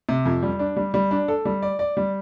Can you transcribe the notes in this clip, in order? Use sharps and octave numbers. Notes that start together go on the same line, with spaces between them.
C3
F2
G3
D4
G3
G3
D4
A4
G3
D5
D5
G3